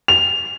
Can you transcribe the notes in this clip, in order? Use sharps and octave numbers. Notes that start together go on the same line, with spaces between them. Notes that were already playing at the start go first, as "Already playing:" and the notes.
F7